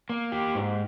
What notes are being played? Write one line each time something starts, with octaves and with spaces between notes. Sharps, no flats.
A#3
G4
G#2